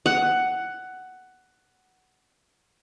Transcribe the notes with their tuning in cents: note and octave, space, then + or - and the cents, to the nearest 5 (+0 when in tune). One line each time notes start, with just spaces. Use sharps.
F#5 +10